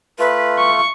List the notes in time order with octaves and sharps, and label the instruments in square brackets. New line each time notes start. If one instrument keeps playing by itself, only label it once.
[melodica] A3 F4 [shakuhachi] B4
[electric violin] C#6